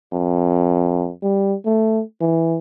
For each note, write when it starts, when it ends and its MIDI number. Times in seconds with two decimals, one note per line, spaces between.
0.13 1.11 41
1.23 1.55 55
1.65 2.02 57
2.21 2.59 52